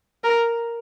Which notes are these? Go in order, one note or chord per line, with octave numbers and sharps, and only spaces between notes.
A#4